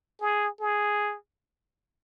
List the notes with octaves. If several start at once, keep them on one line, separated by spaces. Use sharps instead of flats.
G#4
G#4